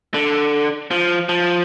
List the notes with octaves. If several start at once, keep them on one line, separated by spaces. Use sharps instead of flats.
D3
F3
F3